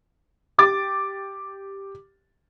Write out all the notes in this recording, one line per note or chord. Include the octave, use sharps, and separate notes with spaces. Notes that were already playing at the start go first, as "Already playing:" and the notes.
G4 D6 A6